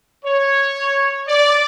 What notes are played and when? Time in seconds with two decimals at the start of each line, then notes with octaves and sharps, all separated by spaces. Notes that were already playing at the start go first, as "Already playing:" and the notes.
0.24 C#5
1.28 D5